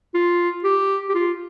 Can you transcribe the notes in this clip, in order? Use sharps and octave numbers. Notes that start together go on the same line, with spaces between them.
F4
G4
G4
F4